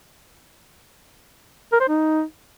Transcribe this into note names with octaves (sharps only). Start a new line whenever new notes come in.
A#4
C5
D#4